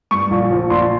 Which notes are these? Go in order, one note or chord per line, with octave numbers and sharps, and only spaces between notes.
G2 C#6
A#1
F3
A#1 C6